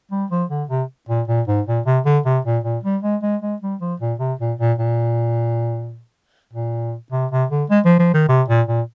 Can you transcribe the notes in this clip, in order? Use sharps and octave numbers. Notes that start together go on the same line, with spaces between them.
G3
F3
D3
C3
A#2
A#2
G#2
A#2
C3
D3
C3
A#2
A#2
G3
G#3
G#3
G#3
G3
F3
A#2
C3
A#2
A#2
A#2
A#2
C3
C3
D3
G#3
F3
F3
D#3
C3
A#2
A#2